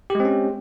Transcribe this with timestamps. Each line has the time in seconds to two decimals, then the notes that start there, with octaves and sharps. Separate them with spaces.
0.10 G4
0.15 G#3
0.20 C4
0.25 C#4